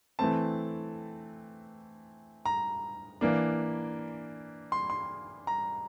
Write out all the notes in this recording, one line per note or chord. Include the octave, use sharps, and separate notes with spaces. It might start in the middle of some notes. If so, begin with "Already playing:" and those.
E3 A3 C4 A5
A#5
E3 A#3 D4
C6
C6
A#5